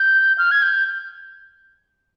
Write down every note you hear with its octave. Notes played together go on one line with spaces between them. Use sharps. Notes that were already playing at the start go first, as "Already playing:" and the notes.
Already playing: G6
F6
G#6
G6